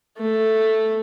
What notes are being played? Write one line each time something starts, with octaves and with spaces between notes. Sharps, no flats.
A3